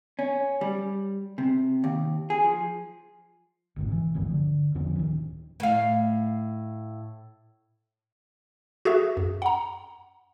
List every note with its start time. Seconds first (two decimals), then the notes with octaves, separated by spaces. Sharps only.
0.19 C#4
0.61 G3
1.38 C3
1.84 D#2
2.30 G#4
2.44 F3
3.76 G1 G#2 C3
3.92 E3
4.15 G1 D2 G2 F3
4.30 D3
4.75 E2 D3 F3 C#4
4.95 D1 D#3
5.60 A2 F5
8.85 F#4 G#4 A4 E5
9.17 F#2
9.42 F#5 A#5